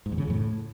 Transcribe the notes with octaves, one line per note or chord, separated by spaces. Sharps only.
G#2
E2
C#3
F2
A2